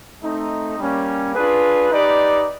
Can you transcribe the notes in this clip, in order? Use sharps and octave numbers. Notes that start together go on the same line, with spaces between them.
A3 C4 D#4
G3 A#3 C#4
D4 F4 G#4 B4
D#4 G4 B4 D5